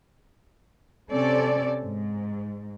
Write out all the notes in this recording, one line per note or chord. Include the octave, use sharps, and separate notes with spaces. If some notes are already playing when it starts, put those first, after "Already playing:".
C3 C4 C#4 A4 D5
G#2